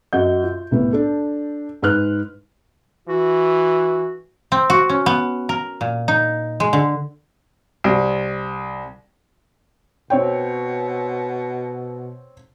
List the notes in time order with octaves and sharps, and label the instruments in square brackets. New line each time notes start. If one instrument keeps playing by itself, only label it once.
[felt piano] F#2 D#5 F#5 G6
F4
C2 A2 B3
D4 A4
G#2 B4 F6 F#6
[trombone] E3 [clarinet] F#4
[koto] C4
F#4
C#4
B3
A#4
A#2
D#4
G#3
D3
[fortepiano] C2
[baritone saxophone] B2 [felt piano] C4 C#5 G5